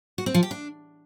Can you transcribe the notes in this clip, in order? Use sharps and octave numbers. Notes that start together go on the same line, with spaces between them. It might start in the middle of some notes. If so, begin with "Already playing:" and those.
F#4
C4
F3
G4
D4